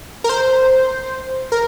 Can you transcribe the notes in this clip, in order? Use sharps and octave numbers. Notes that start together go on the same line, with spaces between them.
A#4
C5
A#4